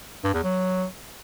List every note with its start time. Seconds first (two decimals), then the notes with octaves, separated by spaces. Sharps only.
0.24 G2
0.34 E2
0.44 F#3